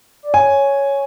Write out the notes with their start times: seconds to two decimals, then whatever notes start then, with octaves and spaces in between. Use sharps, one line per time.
0.23 D5
0.33 C#5 G#5